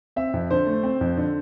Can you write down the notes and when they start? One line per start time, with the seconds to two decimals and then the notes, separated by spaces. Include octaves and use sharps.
0.16 C4 E5
0.34 F2
0.51 D3 C5
0.67 A3
0.83 C4
1.01 F2
1.17 D3